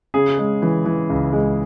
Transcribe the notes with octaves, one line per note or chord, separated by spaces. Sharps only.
C#3 G#4
G#3
E3
E3
C#2
G#3